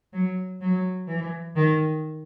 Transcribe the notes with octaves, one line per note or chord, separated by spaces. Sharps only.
F#3
F#3
E3
D#3